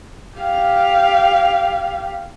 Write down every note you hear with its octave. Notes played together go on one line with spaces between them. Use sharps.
G4 F5